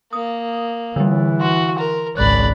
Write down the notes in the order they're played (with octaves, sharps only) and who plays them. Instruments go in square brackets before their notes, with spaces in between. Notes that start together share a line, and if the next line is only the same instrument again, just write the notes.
[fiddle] A#3 [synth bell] D#6
[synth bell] D3 G3 [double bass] E3
[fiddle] F#4 [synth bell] C6
[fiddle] A#4
[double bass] G#1 C#2 [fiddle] D5 B5 [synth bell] F#6